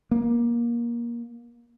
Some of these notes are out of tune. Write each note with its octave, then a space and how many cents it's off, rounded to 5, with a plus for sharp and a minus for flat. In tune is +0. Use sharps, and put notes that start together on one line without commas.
A#3 +20